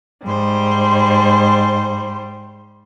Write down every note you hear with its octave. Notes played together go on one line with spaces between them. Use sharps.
G#2 G3 C5